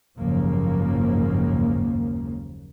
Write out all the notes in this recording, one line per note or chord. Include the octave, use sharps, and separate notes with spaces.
F#1 D#2 G#2 C#3 F3 A#3